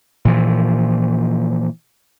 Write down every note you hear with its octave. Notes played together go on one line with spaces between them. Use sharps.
A#2 E3 F3